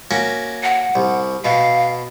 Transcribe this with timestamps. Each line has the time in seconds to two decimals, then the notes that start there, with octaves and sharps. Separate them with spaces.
0.11 A#3 C#4 F#4
0.63 F#5
0.95 C2
1.45 B2 F5